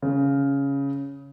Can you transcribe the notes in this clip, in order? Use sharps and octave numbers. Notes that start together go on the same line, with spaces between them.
C#3